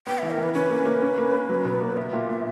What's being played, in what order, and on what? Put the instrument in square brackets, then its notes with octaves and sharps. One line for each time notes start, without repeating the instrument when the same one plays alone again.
[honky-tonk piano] B3 [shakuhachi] G5
[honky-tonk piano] E3 [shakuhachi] E5
[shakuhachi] A#4
[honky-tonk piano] E3 [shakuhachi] B4
[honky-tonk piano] C#4 [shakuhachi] B4
[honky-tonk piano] A#3
A#3
C#4
A#3
C#4
F#3
B2
A#3
[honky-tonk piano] B3 [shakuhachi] E5
[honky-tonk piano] A#2
A#2